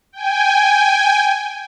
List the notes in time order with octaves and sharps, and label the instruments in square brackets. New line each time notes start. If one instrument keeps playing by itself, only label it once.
[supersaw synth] G5 G#5